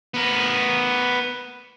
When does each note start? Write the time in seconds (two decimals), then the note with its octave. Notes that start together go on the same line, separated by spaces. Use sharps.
0.14 B3 A#4